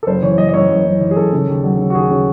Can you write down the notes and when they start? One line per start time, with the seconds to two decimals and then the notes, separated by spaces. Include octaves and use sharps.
0.03 A4
0.07 F#1 C5
0.22 E3 C#5
0.38 F#1 D#5
0.48 D#5
0.54 F#2 C#5
0.70 F#1
0.86 F#2
1.01 E3
1.11 G#4
1.17 F#2 A4
1.33 C#3
1.48 D#2
1.63 F#3
1.78 C#3
1.90 F#4
1.94 D#2 G#4
2.11 C#3 F#4